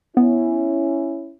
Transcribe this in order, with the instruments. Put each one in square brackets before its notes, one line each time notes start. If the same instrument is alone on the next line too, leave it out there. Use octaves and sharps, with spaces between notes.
[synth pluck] B3 [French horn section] C#4 E4